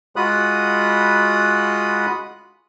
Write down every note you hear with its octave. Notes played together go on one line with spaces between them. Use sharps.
G#3 F4 F#4 B5 D#6 F#6